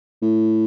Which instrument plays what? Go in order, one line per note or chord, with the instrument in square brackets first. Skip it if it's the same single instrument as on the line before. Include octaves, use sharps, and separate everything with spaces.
[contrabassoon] A2